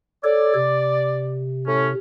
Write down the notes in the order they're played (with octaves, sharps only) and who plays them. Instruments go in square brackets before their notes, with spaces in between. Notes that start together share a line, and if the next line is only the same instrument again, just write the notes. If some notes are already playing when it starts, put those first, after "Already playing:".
[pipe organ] A4 C#5 [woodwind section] D5
[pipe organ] C3
[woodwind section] A2 C#4